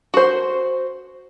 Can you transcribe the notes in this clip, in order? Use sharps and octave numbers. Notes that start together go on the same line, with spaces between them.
F#4 C5